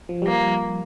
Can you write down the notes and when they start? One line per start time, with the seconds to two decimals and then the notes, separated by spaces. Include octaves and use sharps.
0.09 F3
0.22 G3 A#3
0.34 F3